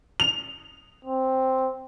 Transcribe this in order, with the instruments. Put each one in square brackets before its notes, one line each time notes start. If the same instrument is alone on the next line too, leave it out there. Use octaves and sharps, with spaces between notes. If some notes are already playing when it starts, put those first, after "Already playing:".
[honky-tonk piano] F7
[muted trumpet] C4